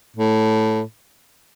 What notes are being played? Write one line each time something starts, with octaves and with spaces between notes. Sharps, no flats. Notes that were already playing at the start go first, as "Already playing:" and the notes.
A2